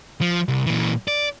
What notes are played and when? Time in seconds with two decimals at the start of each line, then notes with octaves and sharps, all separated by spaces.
0.21 F3
0.48 C2
0.66 A#2 E3
1.08 D5